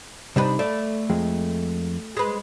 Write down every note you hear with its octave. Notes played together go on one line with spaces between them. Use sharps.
C3 G3 D4 D#4 B4
A3 D5
F2 G#3
G#3 B4